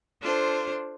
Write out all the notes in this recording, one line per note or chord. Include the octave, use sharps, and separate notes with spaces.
D4 F4 A4 C5